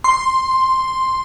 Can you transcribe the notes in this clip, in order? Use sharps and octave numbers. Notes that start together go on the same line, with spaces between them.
C6